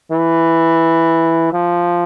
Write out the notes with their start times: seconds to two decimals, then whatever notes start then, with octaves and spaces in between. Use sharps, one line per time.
0.11 E3
1.53 F3